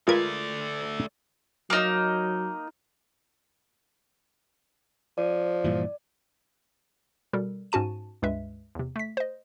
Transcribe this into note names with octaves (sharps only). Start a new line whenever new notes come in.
G#3 A3 F4 A#4 B4 D5 G#6
F#3 A#3 D#4
F3 D5
G2 A#2 E3
B2 G3 A4 A#4
G#2 C#4 F#4 A5 D#7
C#2 G2 G#3 B4 E5
E2 C3
A3 B6
C5 D#5